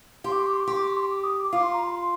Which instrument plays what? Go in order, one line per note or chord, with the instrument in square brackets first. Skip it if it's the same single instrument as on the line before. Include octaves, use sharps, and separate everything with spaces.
[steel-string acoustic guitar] G4 [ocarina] C6
[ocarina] D6
C6
D6
C6
D6
[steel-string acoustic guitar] G4 [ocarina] C6
[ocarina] D6
C6
D6
C6
D6
D#6
D6
[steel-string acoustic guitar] F4 [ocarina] D6
[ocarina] C6
A#5
C6
C6